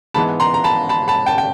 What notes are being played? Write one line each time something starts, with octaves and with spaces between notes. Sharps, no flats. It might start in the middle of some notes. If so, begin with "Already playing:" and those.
G#2 E3 G#3 B3 A5 B5
A#5 C6
A#5
A5 B5
A5 B5
A5 B5
G5 A5
G5